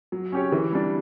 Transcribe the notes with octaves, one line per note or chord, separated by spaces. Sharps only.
F#3
C#4 G4 C#5
E3
G3 D4